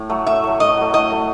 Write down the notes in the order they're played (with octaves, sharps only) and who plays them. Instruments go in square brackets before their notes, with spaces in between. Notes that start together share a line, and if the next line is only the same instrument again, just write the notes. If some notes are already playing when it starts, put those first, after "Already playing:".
Already playing: [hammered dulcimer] A2
F#3 A3
[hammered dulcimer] A2 [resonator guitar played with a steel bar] E5
[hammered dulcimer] F#3 A3
[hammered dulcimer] A2 [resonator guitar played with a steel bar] D#5
[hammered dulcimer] F#3 A3
[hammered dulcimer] A2 [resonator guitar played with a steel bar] D#5
[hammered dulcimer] F#3 A3